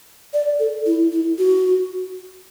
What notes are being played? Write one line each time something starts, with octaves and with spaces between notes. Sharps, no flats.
D5
A4
E4
E4
F#4